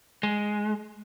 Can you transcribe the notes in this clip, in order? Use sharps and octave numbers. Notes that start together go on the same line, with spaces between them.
G#3